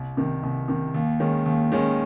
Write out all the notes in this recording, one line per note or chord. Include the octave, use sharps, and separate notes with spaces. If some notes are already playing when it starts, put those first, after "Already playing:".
Already playing: C2
C3 D#3
C2
C3 D#3
D#2
D#3 G#3 C#4
D#2
D#3 G#3 C#4